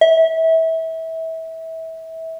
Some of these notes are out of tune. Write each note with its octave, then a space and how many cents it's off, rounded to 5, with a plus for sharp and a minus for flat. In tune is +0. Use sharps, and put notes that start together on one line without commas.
E5 -25